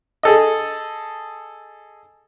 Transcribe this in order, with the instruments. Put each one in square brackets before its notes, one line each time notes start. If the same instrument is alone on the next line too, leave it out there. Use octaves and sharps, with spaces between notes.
[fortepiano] G#4 A4 D#5